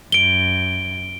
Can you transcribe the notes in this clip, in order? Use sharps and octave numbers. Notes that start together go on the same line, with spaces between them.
F#2 D7 G7